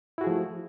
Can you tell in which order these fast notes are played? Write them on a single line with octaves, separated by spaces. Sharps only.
E4 F#4 G#4 F3 A3